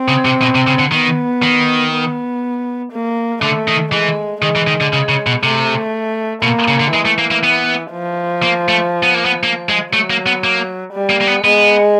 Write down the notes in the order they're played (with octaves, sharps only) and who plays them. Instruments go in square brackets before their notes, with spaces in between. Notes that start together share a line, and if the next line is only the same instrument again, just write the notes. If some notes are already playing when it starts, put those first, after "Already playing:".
Already playing: [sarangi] C4
[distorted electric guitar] C#3
C3
B2
C3
C#3
D3
[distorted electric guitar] D#3 [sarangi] B3
[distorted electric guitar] D#3
[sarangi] B3
A#3
[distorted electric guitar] D3 [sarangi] A3
[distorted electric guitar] D#3
[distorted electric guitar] E3 [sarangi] G#3
[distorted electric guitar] D#3 [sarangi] G#3
[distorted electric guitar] E3
D#3
D3
C#3
C#3
B2
[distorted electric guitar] C3 [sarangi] A3
[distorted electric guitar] B2 [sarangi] A#3
[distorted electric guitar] C#3
D3
[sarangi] E3 [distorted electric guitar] G#3
[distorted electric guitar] A3
A#3
A#3
B3
[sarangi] F3
[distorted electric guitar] A#3
A3
B3
A#3
B3
A#3
G#3
[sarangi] F#3 [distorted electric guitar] A3
[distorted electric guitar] A#3
B3
A#3
[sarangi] G3
[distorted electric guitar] A#3
A#3
B3
[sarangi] G#3 [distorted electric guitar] B3